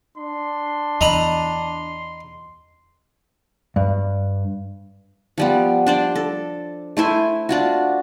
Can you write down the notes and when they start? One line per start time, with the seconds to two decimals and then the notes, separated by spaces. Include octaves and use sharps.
0.17 D4 C6
1.01 E2 D#5 A#5 B5
3.76 G2
5.38 F3 G3 B3
5.87 D4 C5 D5
6.15 A4
6.97 A3 E4 C5 G#5
7.49 D4 F4 F#4